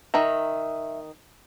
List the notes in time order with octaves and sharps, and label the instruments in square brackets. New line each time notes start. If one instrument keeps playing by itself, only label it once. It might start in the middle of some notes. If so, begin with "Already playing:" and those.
[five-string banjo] D#3 A#5 [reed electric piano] E5